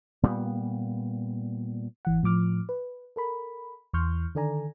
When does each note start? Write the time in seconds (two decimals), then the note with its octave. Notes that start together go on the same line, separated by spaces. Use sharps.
0.23 A#2 G3 G#3 B3
2.05 G#1 E3 F#5
2.23 A2 F3 D6 F6
2.69 B4
3.16 A4 A#4 B5
3.93 E2 E3 C6 C#6 F6 G6
4.35 D3 D#3 A4 D5 G#5 A#5